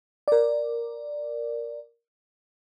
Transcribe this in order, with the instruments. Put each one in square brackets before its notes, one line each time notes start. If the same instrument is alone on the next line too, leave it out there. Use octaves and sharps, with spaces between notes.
[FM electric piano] A#4 D5